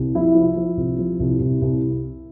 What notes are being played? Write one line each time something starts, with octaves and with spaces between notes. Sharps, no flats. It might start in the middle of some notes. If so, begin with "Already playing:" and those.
Already playing: C2
F3 E4
F3
F3
C2
F3
C2
C2
C2